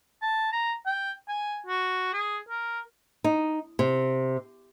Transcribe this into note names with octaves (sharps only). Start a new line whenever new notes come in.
A5
A#5
G5
G#5
F#4
G#4
A#4
D#4
C3